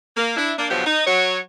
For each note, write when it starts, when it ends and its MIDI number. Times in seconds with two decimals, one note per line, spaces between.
0.17 0.33 58
0.37 0.53 62
0.37 0.53 64
0.58 0.66 58
0.58 0.66 62
0.70 0.84 47
0.70 0.84 50
0.70 0.84 53
0.70 0.84 54
0.70 0.84 67
0.86 1.03 63
1.06 1.38 54
1.06 1.38 73